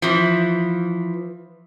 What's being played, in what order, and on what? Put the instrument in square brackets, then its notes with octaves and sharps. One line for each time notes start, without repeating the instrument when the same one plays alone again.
[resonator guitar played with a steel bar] E3 F3